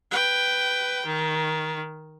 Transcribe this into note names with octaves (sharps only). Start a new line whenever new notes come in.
B4 G5
D#3